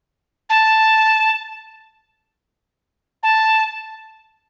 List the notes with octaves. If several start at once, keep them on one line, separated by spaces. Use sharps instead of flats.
A5
A5